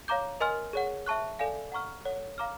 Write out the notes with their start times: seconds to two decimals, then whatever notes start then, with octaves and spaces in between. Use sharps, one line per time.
0.08 C#5 F5 A#5 D6 G6
0.40 A#4 D#5 G#5 C6 F6
0.73 G#4 C#5 F#5
1.06 E5 A5 C#6 F#6
1.39 A4 D5 F5 G#5
1.72 F#5 A#5 C#6 F6
2.05 A4 C#5 F#5
2.38 F5 A#5 D6 F6